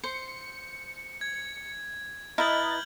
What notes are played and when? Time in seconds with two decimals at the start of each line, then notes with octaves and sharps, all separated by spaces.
0.04 C5 C#7
1.21 G#6
2.38 E4 B4 D#5 A#5 F6 G6 A6 F#7